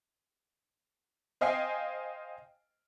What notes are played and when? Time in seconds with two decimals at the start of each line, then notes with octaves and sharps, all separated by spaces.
1.41 C5 D#5 F5 G5 G#5 C7